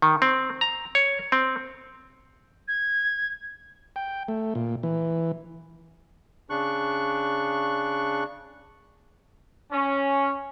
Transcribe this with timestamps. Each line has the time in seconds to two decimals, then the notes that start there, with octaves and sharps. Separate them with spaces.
0.02 D#3
0.22 C4
0.61 A#5
0.95 C#5
1.32 C4
2.68 G#6
3.96 G5
4.28 A3
4.55 A#2
4.83 E3
6.50 C#3 D4 C#6 F#6
9.72 C#4